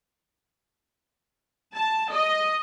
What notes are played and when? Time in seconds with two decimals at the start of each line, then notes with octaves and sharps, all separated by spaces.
1.74 A5
2.11 D#5